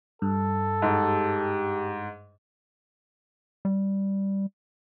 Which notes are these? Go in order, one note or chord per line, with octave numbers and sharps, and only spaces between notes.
G2 A4
G#2 G4
G3